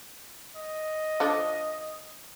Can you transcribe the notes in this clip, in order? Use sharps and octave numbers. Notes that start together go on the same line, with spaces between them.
D#5
D3 F3 D4